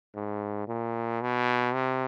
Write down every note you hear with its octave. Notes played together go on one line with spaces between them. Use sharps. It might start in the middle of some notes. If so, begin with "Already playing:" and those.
G#2
A#2
B2
C3